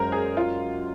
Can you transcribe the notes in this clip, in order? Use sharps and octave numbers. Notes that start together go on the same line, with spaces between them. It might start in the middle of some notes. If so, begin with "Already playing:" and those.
Already playing: F#2 G#3 A#4 C5
G#4
F4